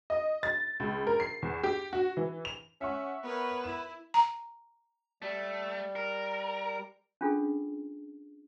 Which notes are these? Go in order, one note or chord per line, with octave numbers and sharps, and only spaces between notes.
D#5
A6
C#2
A#4
C7
E2
G4
F#4
E3
F7
C#4 E5 F#5 C#6
B3 A#4 B4 C#5
E4 E7
A#5
G3 A3
A#4
C#4 D4 F4 G#4 A4